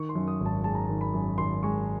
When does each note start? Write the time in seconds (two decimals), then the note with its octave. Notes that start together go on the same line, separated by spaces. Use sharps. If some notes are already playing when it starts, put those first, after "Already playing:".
Already playing: D#3 C#6
0.09 C6
0.15 F#2
0.28 D#6
0.40 G#1
0.46 A5
0.64 G#3 A5
0.75 A#5
0.85 D#3 A5
1.01 B5
1.14 F#2
1.38 G#1 C6
1.63 G#3 C#6